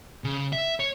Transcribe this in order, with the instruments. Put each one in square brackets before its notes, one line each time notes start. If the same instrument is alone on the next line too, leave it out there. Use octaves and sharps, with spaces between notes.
[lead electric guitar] C#3
E5
C#5